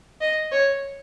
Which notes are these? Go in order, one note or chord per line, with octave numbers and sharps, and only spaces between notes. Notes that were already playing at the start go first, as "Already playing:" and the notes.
D#5
C#5